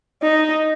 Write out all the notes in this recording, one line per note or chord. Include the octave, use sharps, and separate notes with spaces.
D#4